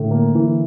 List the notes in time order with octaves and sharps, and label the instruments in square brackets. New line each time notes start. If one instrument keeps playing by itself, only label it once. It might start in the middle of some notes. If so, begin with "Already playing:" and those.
Already playing: [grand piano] A2 [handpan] D3
[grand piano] A#3
E3